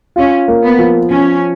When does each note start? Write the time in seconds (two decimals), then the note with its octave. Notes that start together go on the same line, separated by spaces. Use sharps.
0.16 C#4 F4
0.48 A#3
0.64 B3
0.79 F3
1.10 F3 C#4